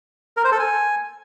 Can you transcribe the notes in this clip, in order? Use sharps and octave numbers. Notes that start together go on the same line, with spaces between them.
A#4
C5
A4
G#5